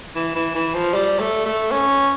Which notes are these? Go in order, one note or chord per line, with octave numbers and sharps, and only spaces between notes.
E3
E3
E3
F3
G3
A3
A3
C#4